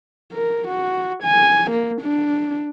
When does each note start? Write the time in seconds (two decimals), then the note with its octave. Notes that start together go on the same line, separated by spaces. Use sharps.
0.32 A#4
0.68 F#4
1.23 G#5
1.71 A#3
2.01 D4